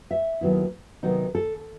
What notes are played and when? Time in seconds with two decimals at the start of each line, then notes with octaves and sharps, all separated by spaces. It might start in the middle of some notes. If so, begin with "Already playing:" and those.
0.11 E5
0.41 D#2 D#3 F#3 B3 E4
1.03 C3 D#3 F#3 B3 D#4
1.35 A4